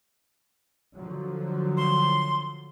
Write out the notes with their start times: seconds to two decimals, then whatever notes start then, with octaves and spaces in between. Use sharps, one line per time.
0.95 D3 F3 F#3
1.77 C6